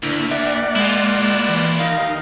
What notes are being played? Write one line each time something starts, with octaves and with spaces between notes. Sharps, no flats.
D2 D3 A#3 E4
A#3 D5 E5 F#5
G#3 E4 F4
E3
D#2 D#4 A#4 F5